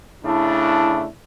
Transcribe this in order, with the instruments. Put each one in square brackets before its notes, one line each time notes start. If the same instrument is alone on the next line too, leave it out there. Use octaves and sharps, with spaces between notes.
[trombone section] C#3 A3 D4 [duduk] E4